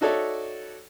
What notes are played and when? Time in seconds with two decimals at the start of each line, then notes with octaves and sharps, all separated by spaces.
0.01 D#4 F#4 A4 C#5 D5 E5